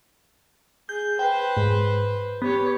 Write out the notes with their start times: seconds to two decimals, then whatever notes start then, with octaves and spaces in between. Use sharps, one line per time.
0.89 G#4 G6
1.19 B4 C5 G5
1.57 G#2
2.42 B3 G4 C#5